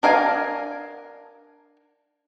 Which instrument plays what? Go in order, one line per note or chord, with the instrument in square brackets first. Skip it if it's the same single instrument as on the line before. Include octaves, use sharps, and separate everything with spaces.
[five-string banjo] D4 A#4 F5 G5 G#5